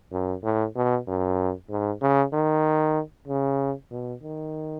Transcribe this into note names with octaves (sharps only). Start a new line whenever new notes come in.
F#2
A2
B2
F#2
G#2
C#3
D#3
C#3
B2
D#3